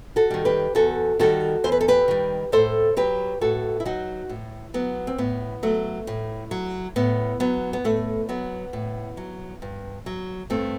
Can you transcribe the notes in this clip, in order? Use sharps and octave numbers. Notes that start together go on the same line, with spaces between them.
F#4 A4
D#3 G3
G4 B4
E2 F#4 A4
D#3 G3 F#4 A4
E2 C5
B4
A4
G4 B4
D#3 G3
A2 A4 C5
F#3 G4 B4
A2 F#4 A4
E4
F#3 D#4 F#4
A2
F#3 B3
C4
A2 B3
F#3 A3
A2
F#3
A2 B3
F#3 B3
B3
A2 A3
F#3 B3
A2
F#3
G2
F#3
G2 A3 C4